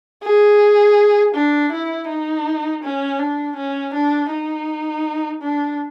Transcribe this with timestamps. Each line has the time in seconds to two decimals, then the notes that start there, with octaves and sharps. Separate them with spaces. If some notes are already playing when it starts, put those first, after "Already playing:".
0.23 G#4
1.35 D4
1.72 E4
2.08 D#4
2.83 C#4
3.19 D4
3.56 C#4
3.94 D4
4.31 D#4
5.41 D4